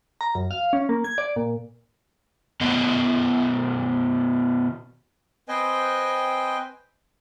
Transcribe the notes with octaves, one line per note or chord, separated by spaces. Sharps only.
A#5
F#2
F5
C#4
A#3
G#6
D5
A#2
B2 D#3 B3 D#5
C4 B4 C5 D#5 G5 G#5